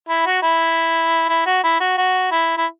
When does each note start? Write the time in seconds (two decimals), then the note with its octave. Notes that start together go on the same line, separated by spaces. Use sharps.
0.09 E4
0.26 F#4
0.42 E4
1.29 E4
1.46 F#4
1.64 E4
1.80 F#4
1.98 F#4
2.32 E4
2.57 E4